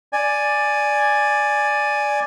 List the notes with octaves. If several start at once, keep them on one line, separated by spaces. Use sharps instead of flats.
D5 G#5